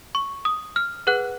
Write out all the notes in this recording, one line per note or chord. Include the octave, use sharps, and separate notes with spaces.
C#6
D#6
F6
G#4 B4 F#5 F#6